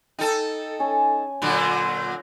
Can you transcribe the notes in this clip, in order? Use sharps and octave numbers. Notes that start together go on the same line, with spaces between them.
D#4 A4 G5 A5
C#4 G#5
A#2 D3 F#3